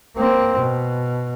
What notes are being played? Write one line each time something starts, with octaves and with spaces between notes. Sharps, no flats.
A#3 C4
B2